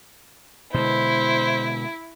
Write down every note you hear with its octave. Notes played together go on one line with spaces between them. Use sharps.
B2 D3 G#3 E4 C5